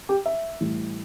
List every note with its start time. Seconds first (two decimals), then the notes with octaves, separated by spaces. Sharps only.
0.09 G4
0.26 E5
0.61 A2 E3 G3